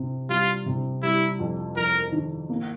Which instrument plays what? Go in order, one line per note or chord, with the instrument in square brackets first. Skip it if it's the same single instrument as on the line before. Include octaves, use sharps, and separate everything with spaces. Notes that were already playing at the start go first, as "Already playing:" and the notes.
Already playing: [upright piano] C3
[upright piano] G3 [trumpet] F4
[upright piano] C3
[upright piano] G3 [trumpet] E4
[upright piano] F2
[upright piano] F2 [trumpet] A#4
[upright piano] D#3
A#3